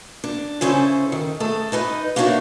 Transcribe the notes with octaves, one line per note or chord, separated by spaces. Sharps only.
D4
C#3 C#4 E4 A4 C5
D#3
A3 G#4 A4
D#4 B4 D#5
A#3 D4 D#4 F#4 C#5 E5